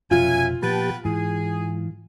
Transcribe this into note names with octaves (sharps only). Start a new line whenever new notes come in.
F1 F#2 B2 F3 F4 E5 G#5
A#2 F3 B3 G4 B4 G5 A5
G#2 E3 G#4